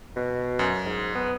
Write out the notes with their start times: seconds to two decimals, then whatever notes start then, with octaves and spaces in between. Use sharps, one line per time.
0.16 B2
0.59 F#2
0.86 G#2
1.15 B3